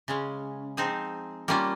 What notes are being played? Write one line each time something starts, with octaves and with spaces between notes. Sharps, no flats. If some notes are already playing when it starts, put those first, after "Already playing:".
C#3 G#3 C#4
F3 C4 D#4 G#4 C5
G3 A#3 C#4 F4